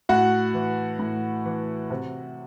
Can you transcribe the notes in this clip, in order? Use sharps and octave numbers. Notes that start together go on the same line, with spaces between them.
A2 F#4 F#5
E3
A2
E3
C3